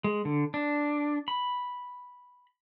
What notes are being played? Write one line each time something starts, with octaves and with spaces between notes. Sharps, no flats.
G#3
D3
D4
B5